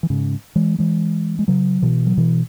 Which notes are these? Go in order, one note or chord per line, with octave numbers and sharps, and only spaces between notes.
E3
G#2 C#3
E3 G#3
E3 G#3
G#3
C#3 F#3
B2 E3
F#3
B2 E3